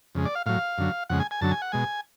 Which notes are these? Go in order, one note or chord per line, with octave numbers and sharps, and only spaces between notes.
F2 C#3 G#3
D5
F5
A2 F#3 F5
F#2 D3 F#3
F2 C#3 G#3 F#5
G#5
G#5
F#2 D3 F#3 A5
G#5
F#5
B2 G#3 G#5